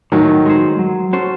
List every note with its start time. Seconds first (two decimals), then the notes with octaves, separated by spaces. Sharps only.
0.12 A2 D#3 F#3
0.46 G#3 D#4 G#4 C5
0.79 F#3
1.13 C#4 F#4 A4 C5